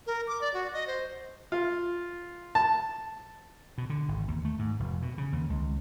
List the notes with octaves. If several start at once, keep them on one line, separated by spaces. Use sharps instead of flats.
A#4
D6
D5
F#4
D#5
C5
F4
A5
B2
D3
G#1
D#2
A3
G#2
F1
B2
C#3
D#2
C#2